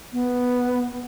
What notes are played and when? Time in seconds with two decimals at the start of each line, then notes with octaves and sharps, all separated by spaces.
0.13 B3